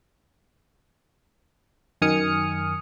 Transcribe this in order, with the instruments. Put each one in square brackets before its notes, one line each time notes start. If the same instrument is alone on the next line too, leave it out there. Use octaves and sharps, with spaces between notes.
[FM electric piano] F#2 D#3 G#5 D#6 F6 C#7